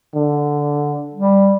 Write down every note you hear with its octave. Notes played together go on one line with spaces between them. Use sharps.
D3
G3